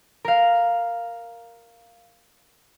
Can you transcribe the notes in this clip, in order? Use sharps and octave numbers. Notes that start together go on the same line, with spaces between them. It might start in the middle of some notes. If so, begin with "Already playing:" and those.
A#4 F5